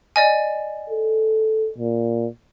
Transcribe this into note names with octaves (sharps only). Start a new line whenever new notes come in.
D5 D#5 G#5
A4
A#2